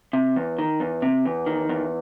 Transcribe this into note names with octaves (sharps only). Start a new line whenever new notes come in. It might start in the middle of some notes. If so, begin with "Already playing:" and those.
C3
E2
D#3
E2
C3
E2
D#3
E2